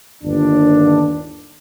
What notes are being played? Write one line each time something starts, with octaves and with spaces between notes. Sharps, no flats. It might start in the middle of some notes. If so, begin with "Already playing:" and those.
G1 D#2 D4